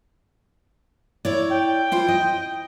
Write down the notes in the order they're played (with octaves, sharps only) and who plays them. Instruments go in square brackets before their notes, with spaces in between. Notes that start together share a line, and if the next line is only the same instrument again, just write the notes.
[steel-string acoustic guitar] E4 C#5 D5
[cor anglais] G5
[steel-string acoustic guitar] E4 F4 C5
D#5